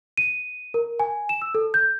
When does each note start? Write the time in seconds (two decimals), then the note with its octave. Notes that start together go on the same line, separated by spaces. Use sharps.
0.18 D#7
0.74 A#4
1.00 G#5
1.29 E7
1.42 E6
1.55 A4
1.74 G6